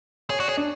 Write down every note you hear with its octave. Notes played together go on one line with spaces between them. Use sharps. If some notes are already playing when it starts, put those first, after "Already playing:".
G#4 C#5
F#4 D5
G#4 C#5
D4